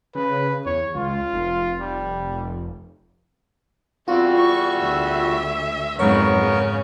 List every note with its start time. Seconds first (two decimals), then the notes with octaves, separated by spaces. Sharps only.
0.15 C#3 B4
0.66 E2 C#5
0.95 C#2 F4
1.33 F1
1.80 G3
4.08 E2 G3 C4 F4 F#4
4.39 C#6
4.79 D2 E5
5.99 F2 G#2 C#3 F#3 B3 A#4 C#5 C#6
6.37 C#3 C#4